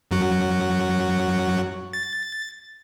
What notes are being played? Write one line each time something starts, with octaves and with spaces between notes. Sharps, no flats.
F#2 F#3 F#4
A6